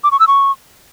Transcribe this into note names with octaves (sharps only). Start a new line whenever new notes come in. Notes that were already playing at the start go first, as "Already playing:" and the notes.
D6
C#6
E6
C#6